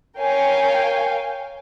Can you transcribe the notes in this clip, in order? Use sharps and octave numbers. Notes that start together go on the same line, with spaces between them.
A#4 C#5 F5 G5 G#5